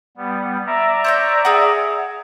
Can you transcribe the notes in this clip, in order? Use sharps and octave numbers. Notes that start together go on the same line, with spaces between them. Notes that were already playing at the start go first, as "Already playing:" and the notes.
G3 B3
D5 E5 A#5
C5 C#5 G6
G#4 F#5